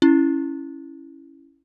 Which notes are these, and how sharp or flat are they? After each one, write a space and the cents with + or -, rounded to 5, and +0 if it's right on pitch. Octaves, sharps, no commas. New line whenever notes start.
C#4 +0 E4 +0